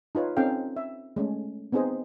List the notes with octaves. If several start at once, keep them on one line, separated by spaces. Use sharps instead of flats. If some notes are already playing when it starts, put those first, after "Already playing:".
D#4 F4 B4 C#5
C4 C#4 D#4 A4 F5 G5
E5
G#3 A3 C#4
B3 C4 D#4 G#4 C5 D#5